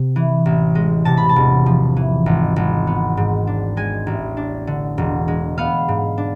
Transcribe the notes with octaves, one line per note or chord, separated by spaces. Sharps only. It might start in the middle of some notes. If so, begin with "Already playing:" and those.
Already playing: C3
E3
A1
G#3
C3 A5
B5
A5
E1
F3
E3
G#1
G#1
B3
G#2
D4
G#3 G#5
A1
D4
D3
E1
G#3
B3 F5
G#2
D4